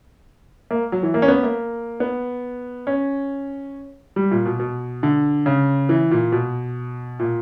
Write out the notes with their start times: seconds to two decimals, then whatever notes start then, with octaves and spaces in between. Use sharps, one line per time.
0.71 A#3
0.92 F#3
1.03 E3
1.14 A#3
1.22 C#4
1.28 B3
1.43 A#3
2.00 B3
2.87 C#4
4.16 G3
4.31 A#2
4.45 B2
4.60 B2
5.03 D3
5.46 C#3
5.89 E3
6.11 A#2
6.32 B2
7.19 A#2